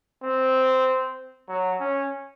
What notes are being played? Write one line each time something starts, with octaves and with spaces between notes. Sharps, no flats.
C4
F#3
C#4